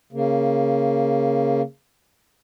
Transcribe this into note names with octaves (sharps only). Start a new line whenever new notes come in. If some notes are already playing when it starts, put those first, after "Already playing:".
C#3 A#3